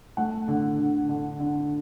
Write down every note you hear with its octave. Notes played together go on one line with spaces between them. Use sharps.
A3 F#5
D3
D3
D3
D3